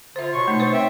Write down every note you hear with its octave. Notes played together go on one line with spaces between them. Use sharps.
D3 F4 C5 E5
B2 C#5 C6 C#6
A3 D#4
B4 C5
C4 E5